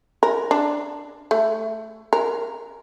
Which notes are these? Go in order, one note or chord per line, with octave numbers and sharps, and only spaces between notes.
A#4
D4
A3
A#4